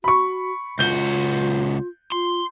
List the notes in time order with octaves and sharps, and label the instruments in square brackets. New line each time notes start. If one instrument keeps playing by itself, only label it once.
[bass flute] F#4 [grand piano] B5 C#6
[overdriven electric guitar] C#2 F#4 [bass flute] F4 [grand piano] G6 G7
[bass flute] F4 [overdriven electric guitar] C6